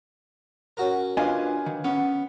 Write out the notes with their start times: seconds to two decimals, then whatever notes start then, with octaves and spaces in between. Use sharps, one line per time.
0.77 C#4 F#4 A#4
1.17 D4 F4 B4 D#5 F5 G#5
1.66 D#3
1.84 B3 C#4